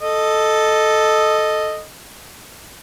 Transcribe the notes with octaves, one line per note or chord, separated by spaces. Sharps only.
A4 D#5